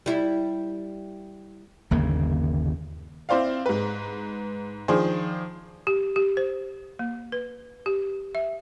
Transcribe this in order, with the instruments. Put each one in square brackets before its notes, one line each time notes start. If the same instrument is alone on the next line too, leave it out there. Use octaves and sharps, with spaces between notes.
[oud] G3 E4
[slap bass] G1 D#2 C#3 A#3
[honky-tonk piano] C4 E4 C5 D5 F5
G#2 B4
D#3 F3 D4 G#4 C5
[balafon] G4
G4
C5
A#3
B4
G4
E5